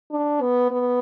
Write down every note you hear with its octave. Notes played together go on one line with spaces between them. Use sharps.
D4
B3
B3